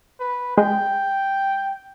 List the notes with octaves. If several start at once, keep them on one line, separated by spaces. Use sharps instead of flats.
B4
G#3 G5